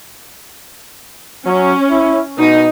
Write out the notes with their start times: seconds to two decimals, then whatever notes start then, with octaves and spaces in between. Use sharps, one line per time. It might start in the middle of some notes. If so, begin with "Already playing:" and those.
1.46 F#3 C#4
1.90 E4
2.38 B2 D#4